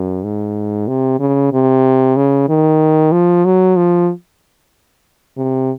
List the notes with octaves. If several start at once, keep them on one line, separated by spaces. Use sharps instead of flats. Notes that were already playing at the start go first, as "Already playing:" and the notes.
Already playing: F#2
G#2
C3
C#3
C3
C#3
D#3
F3
F#3
F3
C3